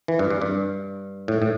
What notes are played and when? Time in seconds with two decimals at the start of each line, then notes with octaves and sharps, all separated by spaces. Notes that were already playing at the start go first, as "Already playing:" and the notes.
0.08 E3
0.19 G2
0.30 G2
0.42 G2
1.28 A2
1.42 A2